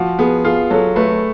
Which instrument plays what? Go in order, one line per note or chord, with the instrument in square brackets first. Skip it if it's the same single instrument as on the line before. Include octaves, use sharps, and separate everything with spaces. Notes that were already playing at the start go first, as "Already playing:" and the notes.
Already playing: [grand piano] F3 [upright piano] F#4
[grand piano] B3 [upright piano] G#4
[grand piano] F4 [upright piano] G#4
[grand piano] F#3 [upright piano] A4
[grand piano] A3 [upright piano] B4